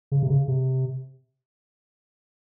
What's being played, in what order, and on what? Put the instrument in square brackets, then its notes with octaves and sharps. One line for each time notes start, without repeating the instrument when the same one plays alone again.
[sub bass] C#3
C3
C#3
C3